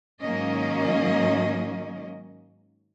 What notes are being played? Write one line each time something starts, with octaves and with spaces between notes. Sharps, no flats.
G#2 D#3 F#3 A#3 C#4 D#5